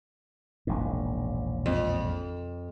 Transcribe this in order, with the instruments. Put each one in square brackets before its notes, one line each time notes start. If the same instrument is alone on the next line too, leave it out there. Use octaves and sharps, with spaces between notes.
[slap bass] E1 A#1 G#2
[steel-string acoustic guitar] F2